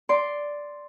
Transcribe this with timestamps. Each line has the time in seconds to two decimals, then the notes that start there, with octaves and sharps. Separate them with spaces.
0.09 D5 C6